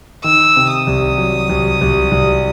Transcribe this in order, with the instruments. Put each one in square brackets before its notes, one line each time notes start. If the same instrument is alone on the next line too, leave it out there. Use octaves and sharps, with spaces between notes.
[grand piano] D#3 [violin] E6
[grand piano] C3
[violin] D#6
[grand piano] C2
F#3
C2
C2
C2